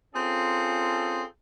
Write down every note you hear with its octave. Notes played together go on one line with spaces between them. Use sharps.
C4 C#4 F4 G#4 A4